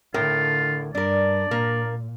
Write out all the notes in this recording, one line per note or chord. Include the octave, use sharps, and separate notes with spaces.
A2 D3 F4 A#4 G5
G2 D4 A#4 D5
A#2 A#3 A#4